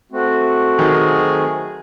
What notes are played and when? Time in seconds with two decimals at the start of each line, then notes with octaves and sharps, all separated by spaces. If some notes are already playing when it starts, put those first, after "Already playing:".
0.12 A3 C4 F#4
0.79 D#3 F#3 G#4